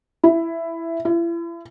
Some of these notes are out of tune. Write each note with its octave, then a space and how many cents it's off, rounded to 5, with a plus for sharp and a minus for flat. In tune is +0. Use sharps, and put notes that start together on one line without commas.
E4 +10
E4 +40